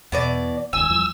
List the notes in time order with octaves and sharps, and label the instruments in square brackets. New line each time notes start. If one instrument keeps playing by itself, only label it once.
[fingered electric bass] E2 [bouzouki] B2 E3 D5
[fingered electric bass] D#1 C#2 D#3 [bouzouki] G#5 [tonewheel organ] E6
[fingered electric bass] E2 F3 G3